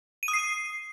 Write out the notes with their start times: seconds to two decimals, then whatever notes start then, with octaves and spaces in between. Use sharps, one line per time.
0.23 D#7
0.28 D#6
0.33 C7